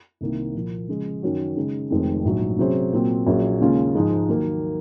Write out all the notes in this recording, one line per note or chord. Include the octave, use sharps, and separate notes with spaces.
C2 C3 D#3 A#3
A#2 F3 A#3
C#3 F3 G#3
F#2 D#3 F#3 C#4 F#4
C#3 G#3 D#4
F1 F2 D#3 G#3 C4
A#1 G#2 F#3
C3 F#3 C#4 G#4 C5
A#2 F#3 C4
A#1 A#2 F#3 C#4 G#4
D#2 C#3 G#3 C#4 F4
G#2 F3 G#3 D#4
D#2 D#3 F#3 A#3